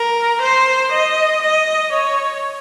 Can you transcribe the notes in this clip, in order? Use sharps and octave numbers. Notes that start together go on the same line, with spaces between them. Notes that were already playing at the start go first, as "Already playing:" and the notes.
Already playing: A#4
C5
D#5
D#5
C#5